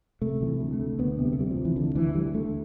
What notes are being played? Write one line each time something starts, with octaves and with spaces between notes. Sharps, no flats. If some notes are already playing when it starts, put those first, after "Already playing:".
C3 A3
C3 F3
E3
D2
A3
D2
D2 B3
C3
G3
A3
D2 G3
F3
C3
E3
D2 D3
D2 E3
D2 G3
D2 A3